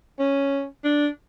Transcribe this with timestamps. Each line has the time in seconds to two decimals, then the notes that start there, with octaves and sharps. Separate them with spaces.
0.19 C#4
0.84 D4